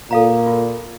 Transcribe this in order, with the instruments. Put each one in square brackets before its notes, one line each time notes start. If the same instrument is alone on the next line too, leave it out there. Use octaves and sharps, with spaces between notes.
[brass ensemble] A#2 [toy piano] A4 F5 A#5
[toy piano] F4